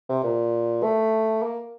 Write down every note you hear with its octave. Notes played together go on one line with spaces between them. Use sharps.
C3
A#2
A3
A#3